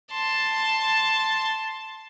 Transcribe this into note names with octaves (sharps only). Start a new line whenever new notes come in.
A5 C6